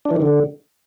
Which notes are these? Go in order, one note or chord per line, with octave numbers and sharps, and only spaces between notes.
D4
E3
D#3
D3